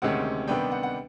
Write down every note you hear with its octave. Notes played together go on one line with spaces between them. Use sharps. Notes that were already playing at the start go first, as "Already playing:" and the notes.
D2 C3 D#3 G#3 C#4 F#5
C3 D#3 G3 B3 D4 G5
F#5
F#5